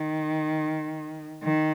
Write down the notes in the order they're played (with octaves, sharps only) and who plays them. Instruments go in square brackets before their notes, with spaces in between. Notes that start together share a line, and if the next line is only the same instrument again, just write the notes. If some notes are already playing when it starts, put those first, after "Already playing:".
Already playing: [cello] D#3
D#3